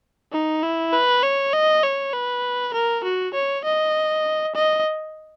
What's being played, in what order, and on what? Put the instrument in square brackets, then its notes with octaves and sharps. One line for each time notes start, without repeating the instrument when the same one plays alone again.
[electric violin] D#4
E4
B4
C#5
D#5
C#5
B4
A#4
F#4
C#5
D#5
D#5